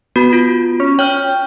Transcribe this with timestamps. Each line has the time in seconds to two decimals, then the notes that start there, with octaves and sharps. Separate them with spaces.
0.16 B3 F#4
0.33 F4
0.80 C#4
0.99 C#5 G5 F6